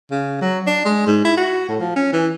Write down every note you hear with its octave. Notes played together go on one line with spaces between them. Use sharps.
C#3
F#3
D4
G#3
G#2
E4
F#4
A2
F3
C#4
E3